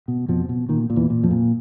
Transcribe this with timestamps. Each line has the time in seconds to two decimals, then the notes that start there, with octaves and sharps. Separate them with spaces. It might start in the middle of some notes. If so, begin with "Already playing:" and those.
0.08 B2
0.28 F2 B2 F3
0.49 B2
0.69 A#2 D#3
0.90 A#2
0.96 E2 E3
1.10 A#2
1.23 F2 F3
1.31 A#2